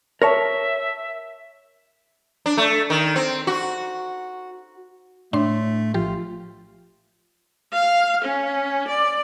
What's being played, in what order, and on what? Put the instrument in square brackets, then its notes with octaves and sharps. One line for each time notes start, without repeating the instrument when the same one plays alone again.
[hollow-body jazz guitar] A#4 C#5 A5 [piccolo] E5
[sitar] D4
A3
D#3
C4
F#4
[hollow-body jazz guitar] A2 [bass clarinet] A3 [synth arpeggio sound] D4 C6
[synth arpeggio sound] A#1 F3 G4 [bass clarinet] F4
[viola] F5
C#4
D5